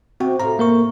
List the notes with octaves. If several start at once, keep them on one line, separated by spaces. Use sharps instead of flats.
C3 C4 F#4 G5
A2 F4 A#5
A#3 A#4 C#6